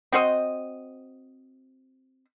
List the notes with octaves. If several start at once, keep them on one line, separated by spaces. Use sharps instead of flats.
C4 F#4 C5 D#5